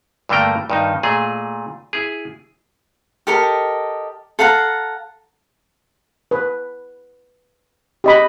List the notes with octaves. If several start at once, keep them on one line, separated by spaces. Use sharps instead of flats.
G2 D3 A3 A#3 G5 A#5
G2 D#3 D#4
A#2 A3 G#4 D#5
E4 G#4
G4 A4 A#4 D#5
A4 F5 F#5 A#5
B4
G4 D#5 B5